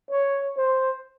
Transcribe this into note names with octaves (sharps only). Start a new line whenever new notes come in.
C#5
C5